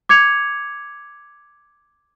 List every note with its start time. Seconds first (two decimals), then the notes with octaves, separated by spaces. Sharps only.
0.09 D6 G#6 C#7 F7